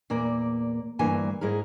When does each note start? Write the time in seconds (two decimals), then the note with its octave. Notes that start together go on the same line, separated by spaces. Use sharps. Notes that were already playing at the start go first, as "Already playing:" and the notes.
0.10 E2 A#2 A#3 D5
0.99 D2 G2 E3 A#3 G#5
1.41 G#2 G#3 E4 A#4